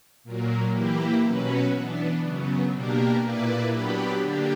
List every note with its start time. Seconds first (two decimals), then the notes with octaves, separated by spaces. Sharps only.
0.24 A#2 F#3 A#3
0.73 E3 A#3 E4 G4
1.23 B2 F#3 C#4 F#4 B4
1.72 E3 B3 D4
2.22 F#2 C#3 F#3 B3
2.72 B2 A#3 D4 G4 A#4
3.22 A#2 A#3 E4 B4 D5
3.71 F#3 B3 D4 G4 B4
4.21 D3 A#3 D4 G4